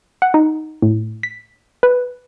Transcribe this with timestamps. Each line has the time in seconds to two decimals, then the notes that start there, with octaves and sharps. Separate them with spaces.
0.22 F#5
0.34 D#4
0.82 A2
1.23 B6
1.83 B4